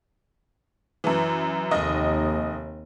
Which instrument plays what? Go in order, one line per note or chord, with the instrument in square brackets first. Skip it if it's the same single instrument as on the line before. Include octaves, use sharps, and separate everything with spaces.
[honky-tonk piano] F#2 E3
[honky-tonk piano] F1 D#5 [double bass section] D#2